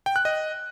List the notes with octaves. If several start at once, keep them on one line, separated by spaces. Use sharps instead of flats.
G5
F#6
D#5